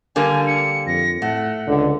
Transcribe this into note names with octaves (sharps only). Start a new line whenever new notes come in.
D3 G3 A#3 G#5
C#7
F2 A#6
A2 A3 F#5
C#2 D3